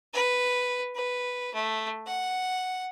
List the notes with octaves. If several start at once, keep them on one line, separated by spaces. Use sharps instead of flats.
B4
B4
A3
F#5